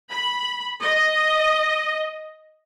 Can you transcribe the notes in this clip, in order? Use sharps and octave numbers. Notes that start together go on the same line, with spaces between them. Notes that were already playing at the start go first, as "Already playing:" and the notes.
B5
D#5